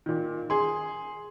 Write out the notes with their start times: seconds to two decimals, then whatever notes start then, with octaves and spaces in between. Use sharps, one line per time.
0.06 A#2 D#3
0.50 G#4 C6